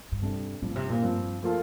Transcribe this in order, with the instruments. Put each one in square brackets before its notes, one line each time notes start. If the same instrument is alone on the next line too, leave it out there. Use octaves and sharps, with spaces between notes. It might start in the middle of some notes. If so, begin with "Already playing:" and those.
[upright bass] G2
[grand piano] C3 G3 D4 A4
[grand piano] G2 F3 C4 [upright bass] A#2
[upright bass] C3
A#2
[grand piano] G2 F3 C4
F3 A#3 F4 A4